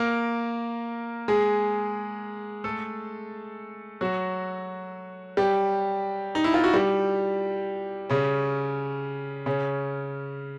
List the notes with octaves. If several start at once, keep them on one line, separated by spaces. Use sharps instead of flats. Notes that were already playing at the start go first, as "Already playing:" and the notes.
Already playing: A#3 A#4
G#3 G#4
A3 A4
F#3 F#4
G3 G4
D#4
E4
F4
F#4
G3 G4
C#3 C#4
C#3 C#4